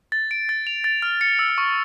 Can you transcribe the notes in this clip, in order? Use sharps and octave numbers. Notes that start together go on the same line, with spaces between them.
A6
D7
A6
F7
A6
F6
C#7
E6
C#6